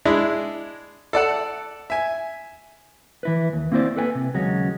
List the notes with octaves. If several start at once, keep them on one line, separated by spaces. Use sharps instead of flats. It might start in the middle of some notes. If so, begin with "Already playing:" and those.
G#3 D4 E4
A4 D5 F#5 A5
E5 G#5
E3 E4 B4
D#2
A#3 C4 E4 A4 C5 D5
A4 B4 G5 G#5
C3
D#2 C#3 F#3 G#3 C#4 F#4